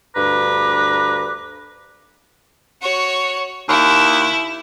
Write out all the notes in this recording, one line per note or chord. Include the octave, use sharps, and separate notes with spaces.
D2 G2 B4 A#5 D6
F#4 C#5
D#2 E4